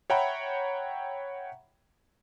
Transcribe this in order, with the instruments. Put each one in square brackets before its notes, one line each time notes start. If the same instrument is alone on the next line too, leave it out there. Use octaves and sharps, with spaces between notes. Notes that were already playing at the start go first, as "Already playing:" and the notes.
[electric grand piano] C#5 E5 F#5 G5 A#5 B5